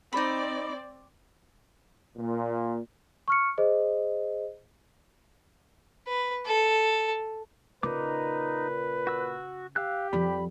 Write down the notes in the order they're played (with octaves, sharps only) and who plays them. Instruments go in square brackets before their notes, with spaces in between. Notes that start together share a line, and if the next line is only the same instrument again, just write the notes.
[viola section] C4 D5 [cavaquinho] D#4 B5
[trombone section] A#2
[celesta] C#6 F6 C#7
G#4 C5 D#5
[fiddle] B4
A4
[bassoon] A#2 [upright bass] C#3 [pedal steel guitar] D#4 D6 [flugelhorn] B4
[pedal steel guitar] F#4 E6
[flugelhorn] G4 [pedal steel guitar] F5 E6 F#6
[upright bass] F2 F3 [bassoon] G3 [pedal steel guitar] B5